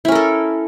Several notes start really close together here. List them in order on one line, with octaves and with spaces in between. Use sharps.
E4 C#4 A#4 A4